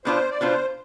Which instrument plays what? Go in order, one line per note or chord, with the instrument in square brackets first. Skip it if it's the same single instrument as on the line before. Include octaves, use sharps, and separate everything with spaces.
[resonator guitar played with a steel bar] B2 B3 D4 F4 [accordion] C5
[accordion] D5
[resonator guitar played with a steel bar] B2 B3 D4 F4 [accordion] C5